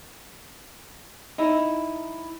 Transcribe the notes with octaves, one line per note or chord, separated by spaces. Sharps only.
D#4 E4